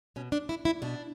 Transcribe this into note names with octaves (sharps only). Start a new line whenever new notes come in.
B2 C#4
D4
E4
E4
B2 D4